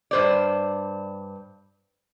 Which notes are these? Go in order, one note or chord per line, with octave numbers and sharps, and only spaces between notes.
G2 C5 D5